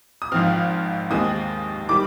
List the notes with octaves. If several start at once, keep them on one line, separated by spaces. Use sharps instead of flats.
D#6
G#1 G#2 F3 C4 F6
D#2 D#3 G#3 C4 D#6
D#3 G3 D6